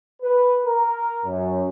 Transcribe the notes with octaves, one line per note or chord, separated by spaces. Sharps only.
B4
A#4
F#2